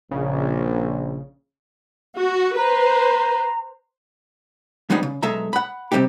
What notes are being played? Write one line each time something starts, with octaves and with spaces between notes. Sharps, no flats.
A#1 C#3
F#4
B4 C5 A#5
F3 G3 G#3 B3 D#4
C#3
B1 G#3 A4 E5 A#5
F#5 B5
C3 G3 C4 D#4 G4